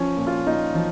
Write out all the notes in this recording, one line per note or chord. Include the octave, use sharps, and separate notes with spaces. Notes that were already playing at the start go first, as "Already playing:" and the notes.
Already playing: F3 C#4
A#2
F4
A#2 D#4
F3